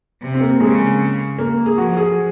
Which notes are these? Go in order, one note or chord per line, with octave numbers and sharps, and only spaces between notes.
C3
C4
A#3
C#3 G#3
A#3
G#4
F3 F#4
G#4